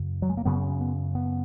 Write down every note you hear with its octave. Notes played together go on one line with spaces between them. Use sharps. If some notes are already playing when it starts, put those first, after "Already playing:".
Already playing: F#2 C#3
F#3
G#3
A#3
F#2 C#3 B3
B3
B3